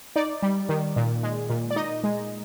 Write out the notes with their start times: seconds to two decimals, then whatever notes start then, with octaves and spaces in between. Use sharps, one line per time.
0.16 D#4 D5
0.42 G3
0.69 D#3
0.96 A#2
1.23 G#3
1.50 A#2
1.71 D5
1.76 D#4 D#5
2.04 G#3